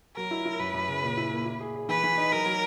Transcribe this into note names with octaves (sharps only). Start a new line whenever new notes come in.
F#3 A#4
E4
E4
F#2 B4
F#2
C#3
A#2
E4
A#3
E4
G#4
G#4
E3 B4
E3
D#4
F#3 A#4
F#3